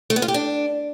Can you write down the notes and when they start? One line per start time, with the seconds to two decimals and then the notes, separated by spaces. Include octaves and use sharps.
0.10 A3
0.16 B3
0.22 F4
0.28 G4
0.34 D4